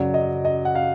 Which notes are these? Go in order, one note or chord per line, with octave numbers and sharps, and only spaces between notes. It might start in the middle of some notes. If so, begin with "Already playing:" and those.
Already playing: F#2 C#3 F#3 D5
D#5
D#5
F#5
F5